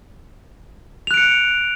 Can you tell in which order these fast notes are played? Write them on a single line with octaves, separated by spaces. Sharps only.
F7 F#6 D7 C#7